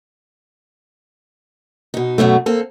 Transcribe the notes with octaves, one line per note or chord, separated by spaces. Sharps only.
B2 D#4
F#2 B2 F#3 A3
A#3 C4 A4